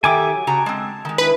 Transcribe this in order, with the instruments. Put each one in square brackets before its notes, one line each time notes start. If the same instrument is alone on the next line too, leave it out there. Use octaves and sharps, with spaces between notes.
[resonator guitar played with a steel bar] D#3 G5 [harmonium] G4 A4 E5 [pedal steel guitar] G#5 D6
[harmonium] F#3
[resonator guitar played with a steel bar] C#3 F#4 A#5 [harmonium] A5
[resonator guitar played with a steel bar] G#3 C4
D#3 G#3
[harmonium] D4 E4 [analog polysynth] B4